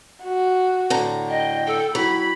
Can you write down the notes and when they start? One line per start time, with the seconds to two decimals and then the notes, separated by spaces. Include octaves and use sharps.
0.24 F#4
0.90 A2 D3 A#5
1.29 D#5 G5
1.66 A4
1.95 F#3 E4 B5